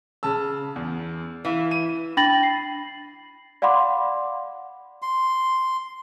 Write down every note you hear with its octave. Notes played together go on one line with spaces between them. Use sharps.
C#3 A5 E6
E2
E3 F5
D#7
D4 G5 B5 A6 A#6 F#7
C7
D5 F5 F#5 B5 C6 D6
C6